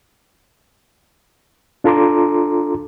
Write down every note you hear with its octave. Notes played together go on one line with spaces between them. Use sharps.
D4 F4 A4 A#5 C6 D6